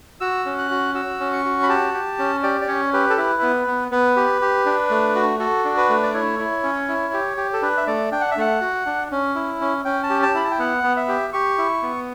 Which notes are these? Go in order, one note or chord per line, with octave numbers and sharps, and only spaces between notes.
F#4 E6
C#4
F#6
F#4
F#4 E6
C#4
C#6
F#4
B5
G4 A5
G4
C#4
G4 D5
D5
C#4 C#5
G4 B4
A4
E4 B4
B3
B3
B3 B4
G4
G4
D4
A3
F#4
F#4 A4
D4
B4
A3
D5
E4 C#5
E4
C#4
E4
G4
G4
A4
D4 B4
E5
A3 D5
D4 G5
F#5
E5
A3 F#5
F#4
D4
C#4
E4
C#4
C#4 G5
A5
G4
A5
E4 B5
A5
G5
B3 F#5
B3
E5
G4
G4 C#6
E4
B3